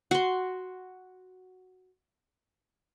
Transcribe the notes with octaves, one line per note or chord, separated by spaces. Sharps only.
F#4 C6